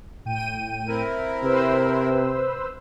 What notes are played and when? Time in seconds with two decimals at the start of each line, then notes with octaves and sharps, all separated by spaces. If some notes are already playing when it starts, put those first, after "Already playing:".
0.25 A2 G5 D#7
0.88 C4 E4 A#4
1.44 C3 B4 C5 E6